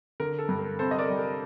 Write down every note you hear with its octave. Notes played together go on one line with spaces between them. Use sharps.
D3 A#4
A4
G2
A#4
C3 A4 C5
D#5
A#4 D5
G3
A#4